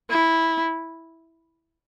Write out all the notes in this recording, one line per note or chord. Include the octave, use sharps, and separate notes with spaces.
E4